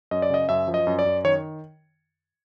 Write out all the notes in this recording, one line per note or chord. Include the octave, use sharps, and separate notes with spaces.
F#2 D#5
D5
C#3 D#5
F#2 E5
F3
D#5
F#2
D5
F#2
D#3 C#5